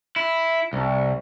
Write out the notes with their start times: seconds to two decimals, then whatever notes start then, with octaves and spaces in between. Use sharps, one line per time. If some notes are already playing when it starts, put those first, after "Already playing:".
0.16 E4
0.73 C2